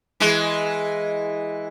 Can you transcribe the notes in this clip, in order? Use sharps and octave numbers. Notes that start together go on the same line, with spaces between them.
E3 G#3